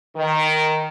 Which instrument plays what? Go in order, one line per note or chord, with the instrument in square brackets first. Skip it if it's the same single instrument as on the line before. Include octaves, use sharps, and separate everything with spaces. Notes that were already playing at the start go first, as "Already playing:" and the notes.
[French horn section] D#3